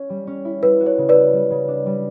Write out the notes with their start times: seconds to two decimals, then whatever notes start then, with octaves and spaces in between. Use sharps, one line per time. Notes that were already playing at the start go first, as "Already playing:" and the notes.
Already playing: C#4
0.10 G3
0.27 C#4
0.45 E4
0.63 G3 B4
0.80 F#4
0.86 C#5
0.98 C#3
1.09 B4 D5
1.15 F#4
1.33 G3
1.50 C#3
1.68 D4
1.86 G3